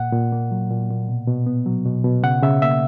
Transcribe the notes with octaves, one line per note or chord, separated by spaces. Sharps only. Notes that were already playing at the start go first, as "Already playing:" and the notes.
Already playing: A#2 F#5
A#2
A#3
F#3
A#2
A#2
B2
B2
B3
F#3
B2
B2
C#3 F#5
C#3 E5
A#3 E5